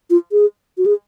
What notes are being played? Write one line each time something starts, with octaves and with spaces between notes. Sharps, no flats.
F4
G#4
F#4
G#4